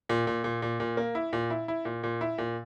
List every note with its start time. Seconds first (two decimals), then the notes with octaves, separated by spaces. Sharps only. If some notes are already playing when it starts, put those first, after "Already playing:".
0.09 A#2
0.27 A#2
0.44 A#2
0.62 A#2
0.80 A#2
0.97 A#3
1.15 E4
1.33 A#2
1.50 E4
1.68 E4
1.85 A#2
2.03 A#2
2.21 E4
2.38 A#2